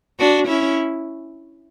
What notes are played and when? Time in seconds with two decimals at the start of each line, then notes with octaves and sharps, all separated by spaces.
0.19 D4 F#4
0.48 C#4 E4